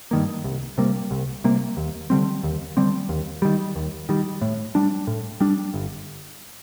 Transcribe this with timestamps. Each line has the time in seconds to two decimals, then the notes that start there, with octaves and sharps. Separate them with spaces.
0.11 G2 D#3 A#3
0.44 C2
0.78 C3 G3 A#3
1.11 C2
1.44 C3 G3 A#3
1.77 D#2
2.10 D3 G3 C4
2.43 D#2
2.77 D3 G3 C4
3.09 D#2
3.42 D#3 G3
3.76 D#2
4.09 D#3 G3
4.42 A2
4.75 G3 D4
5.07 A2
5.40 G3 D4
5.74 G1